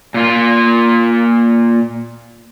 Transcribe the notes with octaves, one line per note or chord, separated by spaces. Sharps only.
A#2 F4